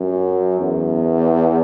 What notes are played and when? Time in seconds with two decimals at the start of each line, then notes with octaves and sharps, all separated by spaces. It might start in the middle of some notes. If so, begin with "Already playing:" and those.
Already playing: F#2
0.60 E2